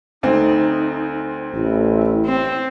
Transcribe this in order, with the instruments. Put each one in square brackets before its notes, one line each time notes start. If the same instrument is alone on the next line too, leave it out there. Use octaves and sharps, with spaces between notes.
[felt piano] D2 C4 [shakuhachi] D#4
[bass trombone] A1 [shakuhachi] E4
[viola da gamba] C4